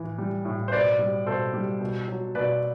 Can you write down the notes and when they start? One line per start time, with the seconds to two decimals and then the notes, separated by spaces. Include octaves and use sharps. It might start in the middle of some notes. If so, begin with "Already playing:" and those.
Already playing: A2 E3
0.18 G3
0.45 A2
0.68 C5
0.72 B2 B4 D5
0.99 G3
1.26 B2 A4 C5
1.54 G3
1.81 B2
2.08 F#3
2.35 B2 B4 D5